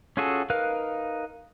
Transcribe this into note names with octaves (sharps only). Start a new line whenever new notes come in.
C#4 F4 F#4 G#4 A4
D#4 A#4 B4 F5 F#6